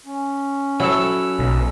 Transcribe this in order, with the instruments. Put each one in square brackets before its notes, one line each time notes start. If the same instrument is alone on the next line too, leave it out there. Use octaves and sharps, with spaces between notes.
[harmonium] C#4
[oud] F#3 [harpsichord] E4 A4
[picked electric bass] B1